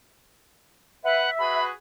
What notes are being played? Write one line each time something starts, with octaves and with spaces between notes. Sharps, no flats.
B4 E5 F#5
F#4 G#4 B4 B5